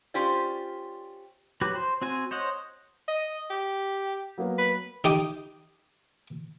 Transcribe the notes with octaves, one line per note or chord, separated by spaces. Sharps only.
C#4 F4 G4 C5 D5
F#3 F#4 G4 B4
C5
C4 F#4 G#5
C5 C#5 D#5 F#5
D#5
G4
F#3 A#3 B3
B4
D#4 G4 D#6